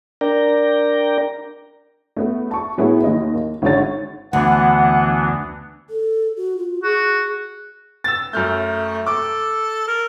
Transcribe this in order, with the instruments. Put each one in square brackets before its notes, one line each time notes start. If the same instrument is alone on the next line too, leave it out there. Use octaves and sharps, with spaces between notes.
[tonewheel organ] D4 A#4 D5 G5 A#5
[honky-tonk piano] A3 B3
A5 C#6
A2 F#3 B3 E4 G#4
D#2 D#5
A#3
G#1 D3 C#5 A6
[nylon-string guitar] D2 [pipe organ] E3 B3 D4 [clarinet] F#5
[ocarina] A4
F#4
F4
[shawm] F#4 [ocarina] G#4
[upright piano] E6 A6
[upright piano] F#2 F6 G6 [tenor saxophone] A3
[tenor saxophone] A4 [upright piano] D6
[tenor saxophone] A#4